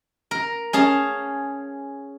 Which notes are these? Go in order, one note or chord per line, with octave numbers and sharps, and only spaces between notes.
A#4
C#4 G#4 F5 A5